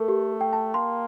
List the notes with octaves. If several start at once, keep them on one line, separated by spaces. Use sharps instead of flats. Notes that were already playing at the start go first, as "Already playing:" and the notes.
Already playing: A3 A4 A#4
G4
G5
A5
A#3 C6